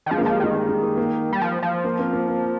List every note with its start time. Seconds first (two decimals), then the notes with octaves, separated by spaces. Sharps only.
0.06 D#3
0.11 F3 G#3
0.18 A#3
0.21 G#3
0.26 F3
0.33 G3
0.40 D#3 G#3
0.55 A#3
0.69 G#3
0.83 A#3
0.97 A#3
1.33 G3
1.41 F3
1.63 F3
1.84 A#3
1.99 C4
2.13 A#3
2.28 A#3